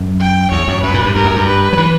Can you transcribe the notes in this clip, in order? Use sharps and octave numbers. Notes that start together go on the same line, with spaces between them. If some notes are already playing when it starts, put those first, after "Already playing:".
Already playing: F#2
G5
E2 C#5
F#2
F#2 B4
A#2
G2
G2 A#4
F#2
G2
B4
F#3
E3